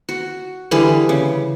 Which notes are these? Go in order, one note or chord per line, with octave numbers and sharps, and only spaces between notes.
F#4
D3 E3 G3 G#4
C#3